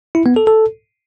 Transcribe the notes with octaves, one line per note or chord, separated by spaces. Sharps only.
E4
B3
A4
A4